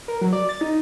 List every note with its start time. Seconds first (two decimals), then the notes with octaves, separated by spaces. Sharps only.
0.08 A#4
0.21 F#3
0.33 D5
0.49 A6
0.61 D#4